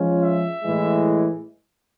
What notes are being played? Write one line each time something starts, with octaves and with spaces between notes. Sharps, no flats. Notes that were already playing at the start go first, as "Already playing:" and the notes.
Already playing: F3 G#3 C#4 F4
E5
A2 E3 G#3